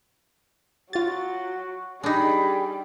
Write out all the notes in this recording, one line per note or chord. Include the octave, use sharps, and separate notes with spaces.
F#3 F4 F#4 A6
G3 D4 D#4 G#4 B5